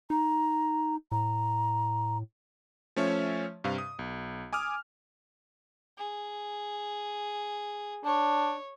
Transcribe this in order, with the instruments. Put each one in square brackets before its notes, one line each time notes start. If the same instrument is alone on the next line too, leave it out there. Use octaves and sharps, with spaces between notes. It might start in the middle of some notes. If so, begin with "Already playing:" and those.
[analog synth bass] D#4 [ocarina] A#5
[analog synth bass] A2 [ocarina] A#5
[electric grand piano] F3 A3 C#4 C#5 E5
G2 C3 F5
D#6
B1
G#5 D6 D#6 F6
[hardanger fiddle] G#4
[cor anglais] D4 [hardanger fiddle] C#5